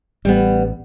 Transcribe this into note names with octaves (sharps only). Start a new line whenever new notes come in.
A1 G3 B3